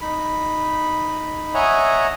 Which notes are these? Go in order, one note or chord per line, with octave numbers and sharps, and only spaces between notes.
D#4 B5
C#5 D#5 E5 F#5 G#5 A#5